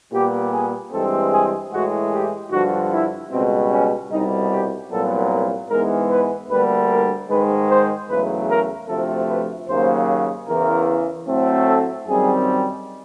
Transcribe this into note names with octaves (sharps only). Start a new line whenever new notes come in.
A#2 G3 B3 G4
G#4
G2 E3 G#3 C4 A4
G#4
A2 E3 G#3 F#4
G4
G2 D3 F3 F#4
E4
C#2 B2 G3 C4
C#4
C2 B2 G3 D#4
G4
C2 A#2 F#3 B3 A4
G#2 E3 G#3 B3 A#4
B4
D2 D3 G3 A#3 B4
A#4
G#2 D#3 G#3 B4
C5
E2 C#3 F#3 A3 B4
A#4
D2 C3 F3 A3 A4
B4
D#2 C#3 F#3 A#3 C5
E2 C#3 E3 A#4
A2 F#3 A3 C4
A4
F#2 D#3 G3 C4 G#4